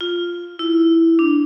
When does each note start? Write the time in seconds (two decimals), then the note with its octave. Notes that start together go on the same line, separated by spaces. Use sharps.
0.01 F4
0.59 E4
1.19 D4